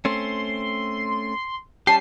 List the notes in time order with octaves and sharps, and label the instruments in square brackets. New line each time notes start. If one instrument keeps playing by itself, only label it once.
[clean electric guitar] A3 C4 C#4 [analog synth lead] C6
[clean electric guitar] G3 C#4 G4 [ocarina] A5 [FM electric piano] C7